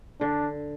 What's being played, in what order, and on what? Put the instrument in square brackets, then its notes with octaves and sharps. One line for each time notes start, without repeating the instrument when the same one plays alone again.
[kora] D3 [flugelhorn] D4